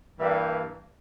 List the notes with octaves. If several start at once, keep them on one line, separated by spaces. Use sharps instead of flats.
G2 E3 G3 A#3 E5